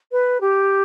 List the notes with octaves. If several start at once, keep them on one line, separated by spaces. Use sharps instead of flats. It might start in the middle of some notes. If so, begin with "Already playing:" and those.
B4
G4